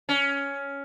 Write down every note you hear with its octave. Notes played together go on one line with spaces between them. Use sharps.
C#4